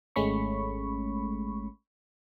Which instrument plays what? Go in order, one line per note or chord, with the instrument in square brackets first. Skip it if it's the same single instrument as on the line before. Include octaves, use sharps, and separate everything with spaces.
[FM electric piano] G#1 G#3 A3 C#4 B5 C#6